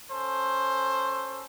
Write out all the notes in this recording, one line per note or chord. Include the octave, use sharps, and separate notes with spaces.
C#4 A4 C5